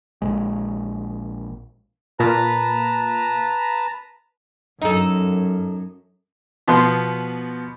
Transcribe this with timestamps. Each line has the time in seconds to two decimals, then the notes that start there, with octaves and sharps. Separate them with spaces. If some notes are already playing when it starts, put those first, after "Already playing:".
0.22 A#1 G#3
2.20 A#2 B4 A5 A#5
4.82 F#2 D#4 A4
6.68 B2 F3 B3 C6